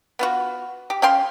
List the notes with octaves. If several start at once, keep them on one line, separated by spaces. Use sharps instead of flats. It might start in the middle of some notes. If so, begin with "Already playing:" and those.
B3 F4 F#4
G4
C#4 F5 G5 C6